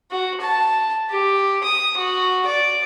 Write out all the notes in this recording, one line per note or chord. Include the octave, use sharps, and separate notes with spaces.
F#4
A5
G4
D#6
F#4
D5